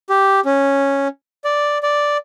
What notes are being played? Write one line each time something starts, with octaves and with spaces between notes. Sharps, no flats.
G4
C#4
D5
D5